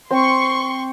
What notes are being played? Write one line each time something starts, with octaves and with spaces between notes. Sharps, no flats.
C4 C6 C#6